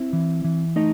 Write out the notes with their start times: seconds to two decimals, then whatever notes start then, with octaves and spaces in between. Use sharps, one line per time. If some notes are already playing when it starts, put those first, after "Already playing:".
Already playing: C4 E4
0.13 E3
0.44 E3
0.76 A3 D#4 D#5